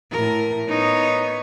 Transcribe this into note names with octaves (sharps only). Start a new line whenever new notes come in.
A2 A#4
B3 D#4 C#5